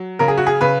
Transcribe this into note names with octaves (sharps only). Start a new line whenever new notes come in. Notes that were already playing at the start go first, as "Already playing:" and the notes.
Already playing: F#3
C#3 A#4
G#4
F#4
G#4
C#3 B4